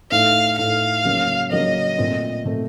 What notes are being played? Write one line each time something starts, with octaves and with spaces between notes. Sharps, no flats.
A2 A3 D#4 F5
A2 A3 D#4 F5
C#3 F#3 A#3
C#3 F#3 A#3 D#5
A#2 A3 C4
A#2 A3 C4